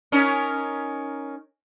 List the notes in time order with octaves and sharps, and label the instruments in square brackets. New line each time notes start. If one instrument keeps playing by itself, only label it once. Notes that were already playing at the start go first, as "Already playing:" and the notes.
[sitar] C#4 D#4 A#4